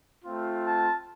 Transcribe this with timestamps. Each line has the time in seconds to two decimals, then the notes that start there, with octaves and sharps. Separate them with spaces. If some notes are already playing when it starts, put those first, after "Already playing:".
0.24 A3 C4 F4
0.65 A5